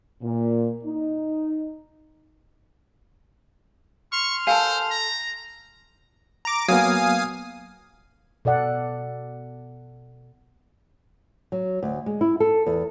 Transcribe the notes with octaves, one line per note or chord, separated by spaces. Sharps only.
A#2
D#4
C6 C#6 F6
A4 A#4 C5 F5 G#5 A5
A#5
A#5 D6
F#3 A#3 B3 F5 G#5 D#6
B2 A4 D5 F#5
F#3
D2
G#3
E4
A4
E2